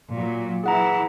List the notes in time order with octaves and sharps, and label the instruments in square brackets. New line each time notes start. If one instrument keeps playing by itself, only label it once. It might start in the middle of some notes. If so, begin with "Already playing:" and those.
[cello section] A#2 F#3
[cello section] E3 E4 [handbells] G#4 F#5 A#5